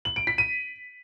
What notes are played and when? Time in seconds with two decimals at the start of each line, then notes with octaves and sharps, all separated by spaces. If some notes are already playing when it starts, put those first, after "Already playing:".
0.05 F#7
0.16 D7
0.27 B6
0.38 D#7